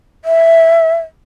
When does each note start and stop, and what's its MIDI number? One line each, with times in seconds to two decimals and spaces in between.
0.25 0.95 76